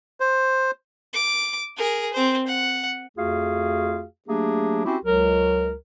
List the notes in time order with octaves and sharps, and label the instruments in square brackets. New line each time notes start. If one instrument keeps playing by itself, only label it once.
[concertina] C5
[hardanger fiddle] D6
G#4 A#4
C4 C5
F#5
[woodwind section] F2 A3 F4 F#4 G#4 F5
F#3 A3 A#3 D4 G4 G#4
C4 C#4 E4 F#4 G4
C#2 F#3 A#4